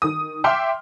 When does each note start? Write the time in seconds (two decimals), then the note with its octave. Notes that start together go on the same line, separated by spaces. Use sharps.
0.02 D#3 D#6
0.44 E5 G5 C6 D6 F6